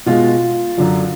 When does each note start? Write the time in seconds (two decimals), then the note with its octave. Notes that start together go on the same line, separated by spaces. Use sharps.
0.06 B2 G#3 F4
0.78 F#2 D3 F#3